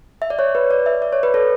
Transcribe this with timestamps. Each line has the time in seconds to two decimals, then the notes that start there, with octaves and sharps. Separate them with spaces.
0.22 E5
0.30 D5
0.39 C#5
0.55 B4
0.71 D5
0.86 E5
1.02 D5
1.13 C#5
1.23 B4
1.34 A4